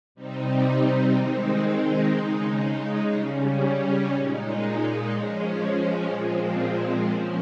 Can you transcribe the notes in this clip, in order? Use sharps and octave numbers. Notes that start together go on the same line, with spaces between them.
C3 G3 C4 D#4
D#3 G#3 C4 D#4
C#3 G#3 D#4
C#3 G3 C#4
A#2 G#3 D#4
F3 G#3 C#4
A#2 F3 G#3 C4
F3 A#3 C#4